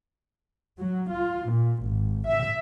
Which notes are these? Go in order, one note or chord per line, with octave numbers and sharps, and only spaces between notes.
F#3
F4
A#2
G#1
E5